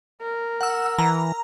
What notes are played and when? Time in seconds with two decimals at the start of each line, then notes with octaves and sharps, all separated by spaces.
0.22 A#4
0.61 F#5 E6
0.98 E3 A#5